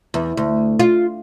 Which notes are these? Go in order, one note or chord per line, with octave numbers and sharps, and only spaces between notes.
E2
D2
F4